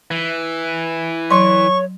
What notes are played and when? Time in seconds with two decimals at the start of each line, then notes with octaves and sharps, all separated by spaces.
0.11 E3
1.31 F#3 C#5 C6 C#6